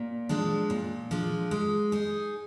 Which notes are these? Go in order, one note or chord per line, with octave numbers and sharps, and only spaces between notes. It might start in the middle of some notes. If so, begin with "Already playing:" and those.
Already playing: A#2
F3 G#3 D4
A#2
F3 G#3 D4
G#3
D#4 G#4